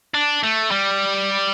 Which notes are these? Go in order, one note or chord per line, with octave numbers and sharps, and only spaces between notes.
D4
A3
G3